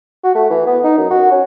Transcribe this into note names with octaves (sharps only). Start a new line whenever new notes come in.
F#4
A3
E3
B3
D#4
F#2
F#4
C#4